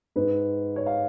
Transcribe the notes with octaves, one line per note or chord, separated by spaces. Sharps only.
G#2 B4
C#5
F5